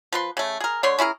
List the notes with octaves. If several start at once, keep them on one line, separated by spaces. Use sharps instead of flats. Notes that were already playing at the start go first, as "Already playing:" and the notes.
F3 B4 C6
C#3 A3
G#4 A#4
D3 A3 C#5 C6
C#4 E4 G#4 A#4